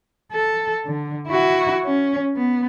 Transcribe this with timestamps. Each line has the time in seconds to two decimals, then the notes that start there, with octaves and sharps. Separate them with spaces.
0.32 A4
0.86 D3
1.27 E4 F#4
1.86 C#4
2.36 B3